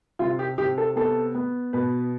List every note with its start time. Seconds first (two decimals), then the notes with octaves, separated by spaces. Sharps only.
0.19 C3 F4
0.39 G4
0.58 C3 G4
0.78 A4
0.96 B3 A4
1.35 B3
1.73 B2 B4